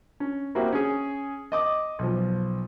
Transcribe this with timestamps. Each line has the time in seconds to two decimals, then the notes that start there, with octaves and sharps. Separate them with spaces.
0.20 C#4
0.55 A#3 C4 E4 F#4 G4
0.72 C#4 G#4
1.52 D#5 D6 D#6
1.99 B1 F3